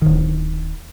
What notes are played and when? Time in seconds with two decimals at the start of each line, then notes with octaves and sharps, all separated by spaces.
0.02 D1 D#3